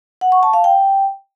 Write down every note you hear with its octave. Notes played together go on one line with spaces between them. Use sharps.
F#5
C#6
A5
F5
G5